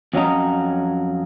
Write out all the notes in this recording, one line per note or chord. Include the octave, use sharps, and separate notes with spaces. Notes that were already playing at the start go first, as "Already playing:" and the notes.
F2 F#3 C#4 D#5 A#5